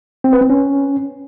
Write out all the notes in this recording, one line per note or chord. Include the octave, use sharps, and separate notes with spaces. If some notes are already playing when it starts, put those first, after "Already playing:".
C4
B4
C4
C#4